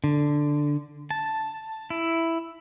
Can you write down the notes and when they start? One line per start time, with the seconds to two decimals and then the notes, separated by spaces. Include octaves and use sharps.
0.04 D3
1.11 A5
1.90 E4